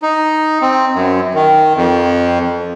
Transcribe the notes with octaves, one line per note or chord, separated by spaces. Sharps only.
D#4
C4
F#2
D#3
F2